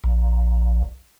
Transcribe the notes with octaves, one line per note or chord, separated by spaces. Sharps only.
A#1